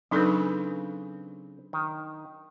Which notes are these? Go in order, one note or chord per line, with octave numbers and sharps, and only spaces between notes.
C#3 F#3 C4 D4 D#4 A4 B4
D#3